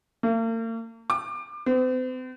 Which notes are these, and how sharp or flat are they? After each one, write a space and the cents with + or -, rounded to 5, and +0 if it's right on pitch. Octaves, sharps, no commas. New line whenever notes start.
A#3 -45
D6 +25
C4 -40